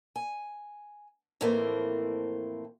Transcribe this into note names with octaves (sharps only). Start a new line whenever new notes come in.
G#5
F2 A2 E3 A3 A#3 C4